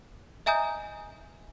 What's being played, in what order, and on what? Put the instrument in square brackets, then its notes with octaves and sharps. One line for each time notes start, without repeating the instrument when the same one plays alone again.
[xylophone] D#5 E5 G#5 A#5 D#6 G6